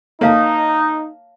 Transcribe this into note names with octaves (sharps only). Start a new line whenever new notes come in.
A#3 D#4 C#5 F5 A5